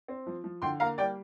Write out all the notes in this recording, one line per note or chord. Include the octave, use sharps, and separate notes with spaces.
C4
F3
F3
D3 G5 C6
A#3 F5 A#5
G3 D5 G5